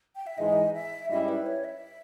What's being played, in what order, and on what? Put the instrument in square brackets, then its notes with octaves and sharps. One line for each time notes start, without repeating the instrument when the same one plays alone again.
[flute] G5
E5
[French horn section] G#2 E3 G#3 D#4 [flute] D#5
[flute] E5
[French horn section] G#2 G3 C#4 E4 [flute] D#5
[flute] B4
C#5
E5